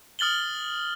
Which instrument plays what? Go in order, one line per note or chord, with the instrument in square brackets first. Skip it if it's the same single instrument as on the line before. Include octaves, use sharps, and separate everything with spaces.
[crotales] D#6 F6 A6 F#7 G7